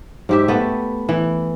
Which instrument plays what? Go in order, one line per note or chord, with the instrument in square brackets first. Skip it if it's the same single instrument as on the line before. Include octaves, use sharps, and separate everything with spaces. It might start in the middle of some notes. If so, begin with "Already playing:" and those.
[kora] G#2 G4 E5
A3 B3
E3